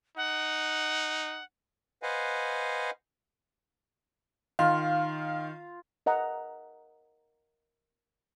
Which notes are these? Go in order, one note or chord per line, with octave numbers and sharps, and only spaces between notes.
D#4 F#5
B4 C5 D#5 F5 F#5 G#5
D#3 F4 F5
A#4 D#5 F#5 A#5